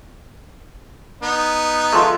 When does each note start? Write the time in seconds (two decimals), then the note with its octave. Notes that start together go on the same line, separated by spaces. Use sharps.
1.23 B3 D#4
1.92 F3 G#3 A3